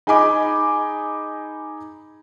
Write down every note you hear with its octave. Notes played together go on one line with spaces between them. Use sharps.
D#4 G#4 D#5 G#5 B5 D6